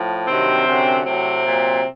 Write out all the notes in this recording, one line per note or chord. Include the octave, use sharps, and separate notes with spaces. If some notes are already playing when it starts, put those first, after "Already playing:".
Already playing: A2 F3
G2 C3 D#3 F#3 C4
F#2 D3 F#3
A2 C3 F#3 C4
A#2 F#3